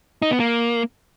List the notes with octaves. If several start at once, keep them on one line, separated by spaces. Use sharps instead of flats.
D#4
B3
A#3